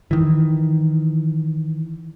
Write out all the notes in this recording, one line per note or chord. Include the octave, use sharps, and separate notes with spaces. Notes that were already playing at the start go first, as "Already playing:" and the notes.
D#3 E3